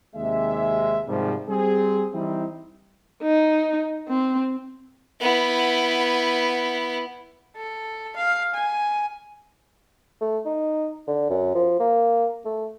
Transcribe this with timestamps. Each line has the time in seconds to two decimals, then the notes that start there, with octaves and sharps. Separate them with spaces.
0.15 D#2 C3 G#3 E5
1.07 G#2 C3 D#3 F3 G3
1.48 G3 C4 G#4
2.13 E3 G3 C4 D#4 E4
3.22 D#4
4.09 C4
5.21 B3 E4
7.56 A4
8.16 F5
8.54 G#5
10.21 A3
10.45 D#4
11.08 D3
11.30 F#2
11.54 F3
11.80 A#3
12.45 A3